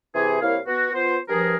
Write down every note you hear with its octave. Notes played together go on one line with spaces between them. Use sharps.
C3 E3 E4 G4 G#4
C2 A#3 E4 C#5 F5
B3 F#4
B3 F4 C5
G2 F3 G#4 A#4